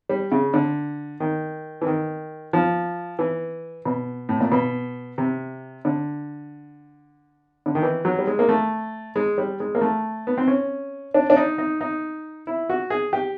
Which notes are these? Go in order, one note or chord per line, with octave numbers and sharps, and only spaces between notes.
G3
C#3
D3
D#3
E3
D#3
F3
E3
B2
A2
A#2
B2
C3
D3
D3
D#3
E3
F#3
G3
G#3
A#3
A3
G#3
G3
G#3
A#3
A3
B3
C4
C#4
D4
D4
D#4
D#4
D#4
E4
F#4
G#4
G4